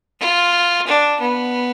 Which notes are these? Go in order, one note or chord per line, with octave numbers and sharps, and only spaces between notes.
F4
D4
B3